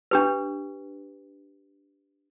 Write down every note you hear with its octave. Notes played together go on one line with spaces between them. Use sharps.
D4 G4 B4